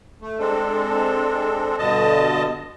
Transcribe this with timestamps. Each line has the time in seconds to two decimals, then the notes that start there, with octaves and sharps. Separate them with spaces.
0.21 A3
0.39 G#3 C4 D4 A4
1.78 G2 B2 D3 D#5 A5